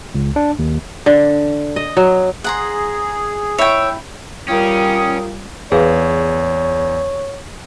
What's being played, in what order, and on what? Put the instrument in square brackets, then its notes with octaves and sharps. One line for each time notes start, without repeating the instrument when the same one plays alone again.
[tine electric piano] C#2
D4
D#2
[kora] D3
D#5
F#3
[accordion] G#4 [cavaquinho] F#5 A#5 C6
[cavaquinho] E4 [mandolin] C#5 G5 [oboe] E6
[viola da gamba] G3 [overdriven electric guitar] C#4 [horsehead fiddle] F4 A#4 [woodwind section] G5 D#6
[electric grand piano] E2 [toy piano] G#4 B4 F5 [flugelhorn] C#5